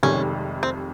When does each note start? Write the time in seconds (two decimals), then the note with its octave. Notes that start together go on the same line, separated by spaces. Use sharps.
0.03 F1 F2 C3 D#3 G#3 C#4
0.63 C4